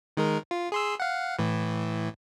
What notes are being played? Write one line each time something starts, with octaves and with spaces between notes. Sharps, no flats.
D#3 G#3 A#4
F4
G#4 C6 E6
F5 F#5
A2 E3